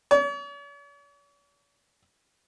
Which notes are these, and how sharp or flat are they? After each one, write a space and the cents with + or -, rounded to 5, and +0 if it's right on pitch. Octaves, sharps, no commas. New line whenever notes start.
C#5 +45